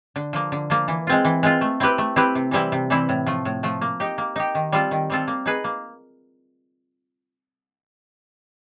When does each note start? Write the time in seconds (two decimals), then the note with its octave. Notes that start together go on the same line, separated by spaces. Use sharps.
0.16 D3
0.33 F3 A#3
0.52 D3
0.70 F3 A#3
0.88 E3
1.07 G#3 C4 F4
1.25 E3
1.43 G#3 C4 F4
1.61 A3
1.80 C4 E4 G4 B4
1.98 A3
2.16 C4 E4 G4 B4
2.35 C3
2.51 E3 G3 C4 E4
2.72 C3
2.90 E3 G3 C4 E4
3.09 A2
3.26 F3 A3
3.45 A2
3.63 F3 A3
3.81 A#3
4.00 D#4 G4
4.18 A#3
4.36 D#4 G4
4.55 D#3
4.72 G3 C4 F4 A4
4.91 D#3
5.10 G3 C4 F4 A4
5.28 A#3
5.46 D#4 G#4 B4
5.64 A#3